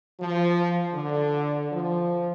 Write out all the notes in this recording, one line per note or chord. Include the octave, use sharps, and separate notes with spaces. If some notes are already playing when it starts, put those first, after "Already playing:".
F3
D3
F3